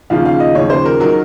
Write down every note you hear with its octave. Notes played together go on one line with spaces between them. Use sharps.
D#2 C#3 F3 F5
F5
D#5
D#2 C#3 F3 C#5
C5
A#4
D#3 F#3 A#4